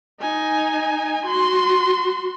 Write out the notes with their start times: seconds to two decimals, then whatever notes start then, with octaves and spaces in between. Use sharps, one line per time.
0.20 D#4 G#5
1.26 F#4 C6